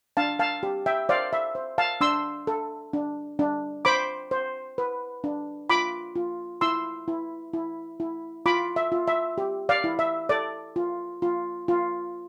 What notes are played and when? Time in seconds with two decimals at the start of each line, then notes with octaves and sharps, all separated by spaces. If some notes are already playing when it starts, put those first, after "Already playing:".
0.17 D4 F5 A5
0.39 F5 A5
0.63 G4
0.86 E5 G5
1.09 C5 D5 F5
1.33 E5
1.55 C5
1.78 F5 A5
2.01 D4 C6 E6
2.47 A4
2.93 D4
3.39 D4
3.85 C5 B5 D6
4.31 C5
4.78 B4
5.24 D4
5.70 F4 B5 D6
6.15 F4
6.61 E4 C6 E6
7.08 E4
7.53 E4
8.00 E4
8.46 F4 B5 D6
8.76 E5
8.92 F4
9.08 E5
9.38 G4
9.69 D5 F5
9.84 E4
9.99 E5
10.29 A4 D5
10.76 F4
11.22 F4
11.68 F4